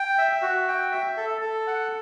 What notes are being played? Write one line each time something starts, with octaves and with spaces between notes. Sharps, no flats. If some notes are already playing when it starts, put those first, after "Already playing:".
Already playing: G5
E5
F#4
G5
E5
A4
A4
F#5